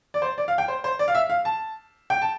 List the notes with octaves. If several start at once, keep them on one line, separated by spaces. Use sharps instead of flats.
D5
C5
D5
F5
G5
C5
C5
D5
F5
E5
F5
A5
G5
A5